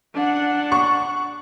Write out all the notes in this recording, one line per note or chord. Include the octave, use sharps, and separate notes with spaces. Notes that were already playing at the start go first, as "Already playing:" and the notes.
D4 F#5
C#6